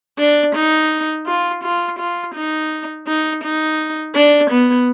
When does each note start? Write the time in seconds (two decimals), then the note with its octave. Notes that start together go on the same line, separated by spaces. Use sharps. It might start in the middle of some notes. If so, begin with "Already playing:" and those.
0.18 D4
0.55 D#4
1.26 F4
1.63 F4
1.99 F4
2.35 D#4
3.07 D#4
3.43 D#4
4.15 D4
4.50 B3